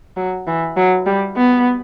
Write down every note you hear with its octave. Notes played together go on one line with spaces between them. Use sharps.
F#3
E3
F#3
G3
B3